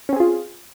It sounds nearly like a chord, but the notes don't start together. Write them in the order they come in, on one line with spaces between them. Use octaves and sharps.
C#4 C4 G#4 F4